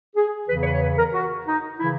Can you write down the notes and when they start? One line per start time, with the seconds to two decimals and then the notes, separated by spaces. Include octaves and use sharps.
0.16 G#4
0.48 E2 C#3 E3 B4
0.61 C#5
0.65 B4
0.72 C#5
0.81 B4
0.98 A#4
1.14 F#4
1.47 D#4
1.79 C#3 E3 E4